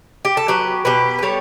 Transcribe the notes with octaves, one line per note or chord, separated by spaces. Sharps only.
G4
A4
F#3 G4 B4
B2 G4 B4
B4
G3 A4 C#5